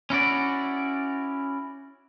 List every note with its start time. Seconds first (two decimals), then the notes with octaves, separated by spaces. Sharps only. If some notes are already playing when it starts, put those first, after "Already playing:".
0.10 C#4 E4 F#4 D5